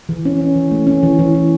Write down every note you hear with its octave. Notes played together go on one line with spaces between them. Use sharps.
E3
C#4
C#4
E3
A3
C#4
E3
E3
E3